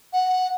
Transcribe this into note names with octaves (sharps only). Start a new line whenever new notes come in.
F#5